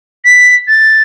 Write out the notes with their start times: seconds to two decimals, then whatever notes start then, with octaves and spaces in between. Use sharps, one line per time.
0.25 B6
0.68 A6